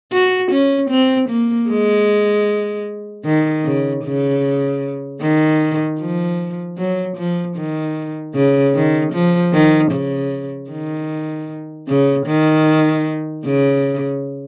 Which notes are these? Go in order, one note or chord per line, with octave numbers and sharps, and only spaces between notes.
F#4
C#4
C4
A#3
G#3
D#3
C#3
C#3
D#3
F3
F#3
F3
D#3
C#3
D#3
F3
D#3
C#3
D#3
C#3
D#3
C#3